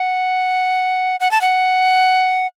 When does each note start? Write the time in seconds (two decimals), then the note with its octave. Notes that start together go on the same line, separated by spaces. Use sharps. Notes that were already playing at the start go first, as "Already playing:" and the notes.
Already playing: F#5
1.20 F#5
1.31 A5
1.41 F#5